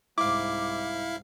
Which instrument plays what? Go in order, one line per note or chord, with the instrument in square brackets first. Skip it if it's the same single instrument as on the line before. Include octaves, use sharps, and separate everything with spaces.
[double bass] C2 G#2 [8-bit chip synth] E4 F5 [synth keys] D6